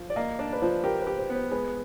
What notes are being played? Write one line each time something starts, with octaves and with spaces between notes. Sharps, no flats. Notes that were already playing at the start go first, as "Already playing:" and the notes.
Already playing: F3
D5
A#3 D#5
D4 D5
B4
F3 C5
G4 A#4
B4
G4
C5
B3 C5
G#3 B4